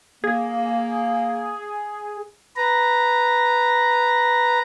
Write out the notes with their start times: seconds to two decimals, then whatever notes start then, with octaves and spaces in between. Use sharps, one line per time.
0.24 A#3 G#4
2.56 B4 A#5